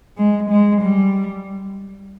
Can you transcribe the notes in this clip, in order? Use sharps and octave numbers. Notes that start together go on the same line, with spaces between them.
G#3
G#3
G3